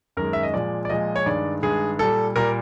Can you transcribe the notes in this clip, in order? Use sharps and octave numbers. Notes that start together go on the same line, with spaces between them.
F#2 D#3 G#3 A#4
E5
D#5
A#2 F3 G#3 D5
D5
A#2 F3 G#3 D#5
C#5
G2 D#3 G#3 D5
G2 D#3 G#3 G#4
A#2 G3 A4
A#2 G3 A#4